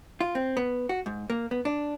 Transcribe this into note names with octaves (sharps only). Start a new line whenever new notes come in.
F4
C4
B3
F#4
G#2
A#3
B3
D4